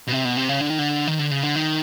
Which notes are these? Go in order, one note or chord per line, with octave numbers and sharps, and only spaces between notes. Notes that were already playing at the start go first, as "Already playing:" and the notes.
B2
C3
B2
C3
C#3
D3
D#3
D3
D#3
D3
C#3
D3
D#3